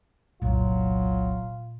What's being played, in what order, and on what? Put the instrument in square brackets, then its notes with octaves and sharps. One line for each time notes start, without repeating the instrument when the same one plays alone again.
[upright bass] F#1 C2 [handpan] A#2 [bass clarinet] F#3 [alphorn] F4